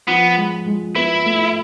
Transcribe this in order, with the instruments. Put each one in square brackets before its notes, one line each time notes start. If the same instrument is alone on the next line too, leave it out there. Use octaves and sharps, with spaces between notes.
[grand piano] F3 [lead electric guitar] B3
[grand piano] G#3
G#3
[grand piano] B3 [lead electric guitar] E4
[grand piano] A3